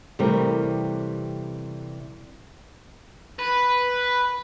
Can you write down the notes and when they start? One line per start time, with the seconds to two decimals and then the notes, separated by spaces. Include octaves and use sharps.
0.19 C3 E3 G3 A3 C4 A#4
3.39 B4